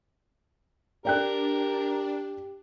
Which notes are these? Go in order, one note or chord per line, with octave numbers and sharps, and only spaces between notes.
D4 G4 A#4 D5 G5 F#6